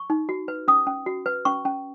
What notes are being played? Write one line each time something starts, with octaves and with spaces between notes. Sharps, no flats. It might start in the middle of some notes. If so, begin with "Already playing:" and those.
Already playing: C#6
D#4
F#4
B4
C#4 D#6
C#4
F#4
B4
C#4 C#6
C#4